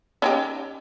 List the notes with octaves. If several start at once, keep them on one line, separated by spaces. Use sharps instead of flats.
C#4 D#4 G4